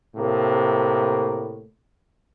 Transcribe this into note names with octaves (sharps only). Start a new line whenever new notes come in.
A2 C3 A#3